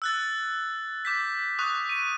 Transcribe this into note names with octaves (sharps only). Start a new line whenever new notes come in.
E6 F#6 A6
D6 G6 B6
C#6 D#6 F#6
D#7